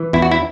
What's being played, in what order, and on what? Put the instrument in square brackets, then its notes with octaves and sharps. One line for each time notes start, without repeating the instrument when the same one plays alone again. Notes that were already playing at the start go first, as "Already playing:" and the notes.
Already playing: [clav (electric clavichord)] E3
E2 E4
F#4
E4